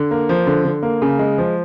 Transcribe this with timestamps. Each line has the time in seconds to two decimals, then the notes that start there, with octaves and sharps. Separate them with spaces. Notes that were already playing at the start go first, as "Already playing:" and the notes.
Already playing: D3
0.11 A#3
0.29 F3
0.47 D3
0.65 D3
0.83 A#3
1.02 C#3
1.19 G#3
1.38 F3